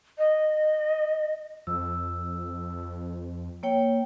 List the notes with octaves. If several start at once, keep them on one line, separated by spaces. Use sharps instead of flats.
D#5
F2 E6
A#3 C#5 G5